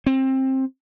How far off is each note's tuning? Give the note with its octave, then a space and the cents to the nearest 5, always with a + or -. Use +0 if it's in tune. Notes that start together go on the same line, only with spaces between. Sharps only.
C4 +20